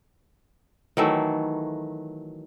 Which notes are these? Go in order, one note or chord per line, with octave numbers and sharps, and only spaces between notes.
D#3 E3 F#3 A3